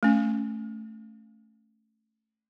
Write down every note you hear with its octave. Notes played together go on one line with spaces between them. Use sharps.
A3 C#4